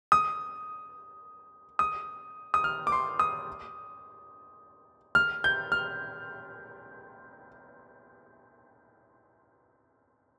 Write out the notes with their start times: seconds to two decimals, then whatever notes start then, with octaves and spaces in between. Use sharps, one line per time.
0.12 D#6
1.79 D#6
2.54 D#6
2.64 F6
2.87 D6
2.92 C6
3.19 D#6
5.15 F6
5.44 G6
5.72 F6